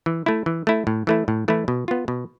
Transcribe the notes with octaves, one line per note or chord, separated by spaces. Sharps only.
E3
A3 E4
E3
A3 E4
A2
E3 A3 E4
A2
E3 A3 E4
B2
B3 F4
B2